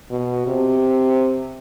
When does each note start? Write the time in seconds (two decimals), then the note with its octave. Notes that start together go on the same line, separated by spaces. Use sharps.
0.11 B2
0.47 C3